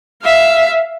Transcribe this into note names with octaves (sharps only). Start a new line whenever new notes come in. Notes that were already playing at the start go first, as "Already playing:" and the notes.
E5 F5